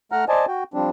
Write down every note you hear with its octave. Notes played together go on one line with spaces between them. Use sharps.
A3 F#5 A#5 F6
C5 D5 D#5 G#5 A5
F#4 G5
F3 G3 C4 D4